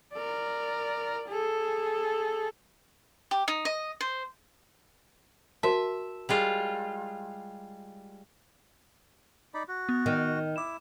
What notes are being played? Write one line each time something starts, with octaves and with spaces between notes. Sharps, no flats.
A#4 D5
G#4 A4
G4
D#4
D#5
C5
F#4 A#4 E5 A5
G3 G#3 F4
D#4 D5 B5
F#4
B3
D#3
E4 D6 E7